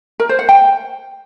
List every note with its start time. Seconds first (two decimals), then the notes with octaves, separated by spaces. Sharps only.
0.20 A#4
0.29 C5
0.39 F#5
0.49 G5